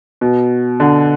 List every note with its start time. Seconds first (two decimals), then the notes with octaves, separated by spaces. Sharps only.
0.21 B2
0.80 D3